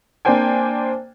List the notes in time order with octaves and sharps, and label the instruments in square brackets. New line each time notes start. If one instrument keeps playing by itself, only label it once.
[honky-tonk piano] A#3 C4 D4 C5 G5 G#5